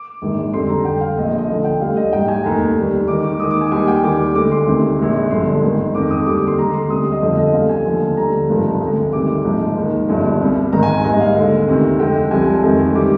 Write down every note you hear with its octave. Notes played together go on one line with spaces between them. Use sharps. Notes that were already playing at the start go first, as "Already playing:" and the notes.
Already playing: D6
A#1 G#2 D#3 G#3
F2 D3 G3 C6
A#5
F2 D3 G3 G5
F5
A#1 A#2 F3 D#5
D#5
D2 D3 F3
G5
D2 D3 G3 F5
D#5
A#1 G#2 G3 G5
G#5
F1 D#2 D#3 A#5
D#2 D#3 G3
D#2 D#3 G#3 D6
D6
D#2 D#3 G#3 D#6
D6
G#5
D#2 D#3 G3 G#5
G5
D#2 D#3 G3 D6
D2 D3 G#3 D6
C6
D2 C3 D#3
A#1 A#2 G#3
G1 G2 D3 F3 G#3 C6
G#1 G#2 D#3
F2 D#3 G#3 D6
D#6
D#2 D3 G3 D6
D6
C6
D#2 D3 G#3 A#5
C6
D2 C3 G3 D#6
D#5
G1 F2 D3 F3 G#3 D#5
D#5
D2 D3 G3 F5
G#5
D#2 D3 F3
D2 D3 G3 A#5
G#1 G2 F3 G#3
D2 D3 G#3
D2 C3 D#3 G3 D6
A#1 G#2 F3 G#3
D#2 D#3 G#3
G1 G2 F3 G#3
C2 C3 G3
G#1 G#2 D#3 G#3 A#5
G#5
A#1 G#2 G3 D#5
F5
D#2 D3 G#3 F5
D2 C3 D#3
F2 D3 G#3 G5
C2 C3 F3 G#3 G#5
F1 F2 D#3 G#3
C3 D#3 G3 D6